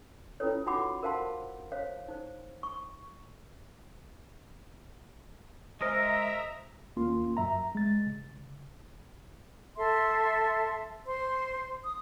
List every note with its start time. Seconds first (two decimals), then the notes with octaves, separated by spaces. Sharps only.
0.40 C#4 E4 F4 A4 B4 C#5
0.66 D#4 F4 F#4 F#5 B5 D6
1.03 A#4 C5 F5 F#5 A5 C6
1.72 C5 C#5 F5
2.08 D#4 C5
2.63 C#6
5.81 G#3 A#4 C5 D#5 E5 A#5 D#6 A#6
6.97 D#2 A#3 C#4 F4 C6
7.37 F#2 E5 A#5
7.75 G#3 A6
8.06 C#3
9.77 A4 E5 C6
11.07 C5 C6
11.83 D#6